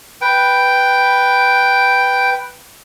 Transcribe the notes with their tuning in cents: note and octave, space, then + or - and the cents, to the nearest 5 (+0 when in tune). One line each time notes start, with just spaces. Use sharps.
B4 +0 G5 +0